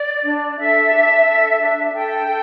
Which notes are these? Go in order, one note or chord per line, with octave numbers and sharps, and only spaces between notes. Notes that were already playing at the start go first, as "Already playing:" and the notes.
Already playing: D5
D4
A4 E5
D4
A4
D4
A4 G5
A4